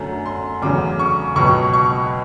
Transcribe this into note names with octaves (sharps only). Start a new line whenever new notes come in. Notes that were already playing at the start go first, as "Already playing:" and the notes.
Already playing: F#2 D3 F#3 A3 C#4
C6
E2 C#3 F#3 A3 C#4 D6
C#6
C#2 B2 F#3 C#6
C#6